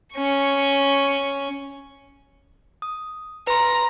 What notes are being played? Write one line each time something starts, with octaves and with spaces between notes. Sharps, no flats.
C#4 C#6
D#6
B4 A#5 C6